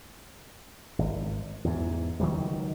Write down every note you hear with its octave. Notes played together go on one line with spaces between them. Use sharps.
G#1
E2 G#2
C#2 D#3 F#3 G3